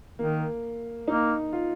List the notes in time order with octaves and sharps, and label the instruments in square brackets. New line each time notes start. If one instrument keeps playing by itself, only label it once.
[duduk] D#3 [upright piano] A#3
[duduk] A#3 [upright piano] D#4
[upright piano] F4